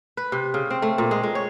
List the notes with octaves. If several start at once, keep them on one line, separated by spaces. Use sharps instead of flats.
B4
C3
C#3
C4
A3
A#2
G#3
G#3
C#5